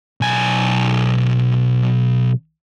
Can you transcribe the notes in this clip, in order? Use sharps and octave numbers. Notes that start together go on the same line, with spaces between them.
B1 G#5